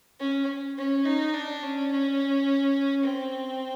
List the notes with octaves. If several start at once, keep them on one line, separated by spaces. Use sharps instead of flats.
C#4
C#4
D#4
D4
C#4
C#4
C4